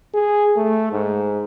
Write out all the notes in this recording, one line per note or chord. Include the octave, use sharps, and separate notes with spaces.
G#4
A3
G#2